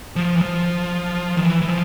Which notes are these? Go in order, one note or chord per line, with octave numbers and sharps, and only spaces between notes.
F3
E3
F3
D#3
E3
E3
F3